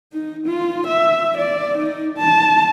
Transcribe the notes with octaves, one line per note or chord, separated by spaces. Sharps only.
D#4
F4
E5
D5
D#4
A5